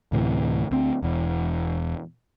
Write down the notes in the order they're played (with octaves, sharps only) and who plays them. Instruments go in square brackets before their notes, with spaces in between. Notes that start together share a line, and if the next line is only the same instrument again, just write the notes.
[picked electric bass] D2 A2 C3 E3
D2 C4
E1 E2